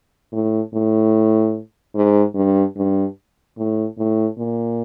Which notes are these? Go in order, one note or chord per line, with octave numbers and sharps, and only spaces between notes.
A2
A2
G#2
G2
G2
A2
A2
A#2